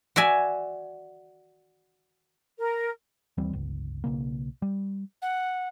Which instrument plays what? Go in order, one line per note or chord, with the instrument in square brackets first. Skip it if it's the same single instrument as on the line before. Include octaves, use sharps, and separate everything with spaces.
[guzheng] F#4 D5 E5 G#5
[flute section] A#4
[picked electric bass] D#2 E3 G3 C4
G1 C#2
B1 C#3 A#3
G3
[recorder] F#5